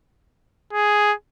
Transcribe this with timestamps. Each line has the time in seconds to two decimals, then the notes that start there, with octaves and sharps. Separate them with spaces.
0.73 G#4